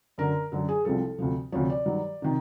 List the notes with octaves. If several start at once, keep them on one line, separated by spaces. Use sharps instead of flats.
F#2 D3 F#3 A#4
F#2 D3 F#3
G#4
C2 C3 F3 A4
D2 C3 F3
D2 C3 F3 C#5
D5
G2 D#3 F#3
C3 D#3